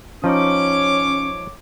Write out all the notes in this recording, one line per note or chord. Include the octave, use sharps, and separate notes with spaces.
F3 C#4 D#4 C#5 D6